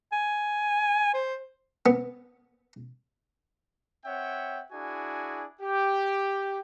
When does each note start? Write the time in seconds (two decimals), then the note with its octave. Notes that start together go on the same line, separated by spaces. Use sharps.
0.12 G#5
1.14 C5
1.86 B3
4.05 C4 C#5 E5 F#5 G5
4.72 D4 E4 F#4 G#4 G#5
5.61 G4